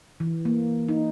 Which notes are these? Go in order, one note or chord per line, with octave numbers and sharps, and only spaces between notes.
E3
A#3
D#4